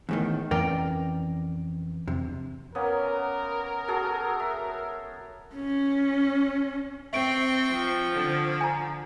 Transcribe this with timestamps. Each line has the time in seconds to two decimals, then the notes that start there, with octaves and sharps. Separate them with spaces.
0.09 E2 A2 D#3
0.51 F2 E3 C#4 A#4 D5 G5
2.08 F2 C3
2.75 A#3 B3 C#4 A#4
3.88 F#4 G#4 A4
4.40 E5
5.54 C#4
7.13 C4 E5 G5 C#6 D7
7.72 F3
8.13 D3
8.61 G#5 A#5